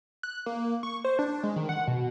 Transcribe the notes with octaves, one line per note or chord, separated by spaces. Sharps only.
F#6
A#3
C#6
C5
D4
G#3
D#3
F#5
B2